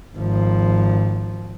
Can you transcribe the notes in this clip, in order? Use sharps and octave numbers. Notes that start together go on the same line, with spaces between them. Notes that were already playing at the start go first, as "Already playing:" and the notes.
G#1 F3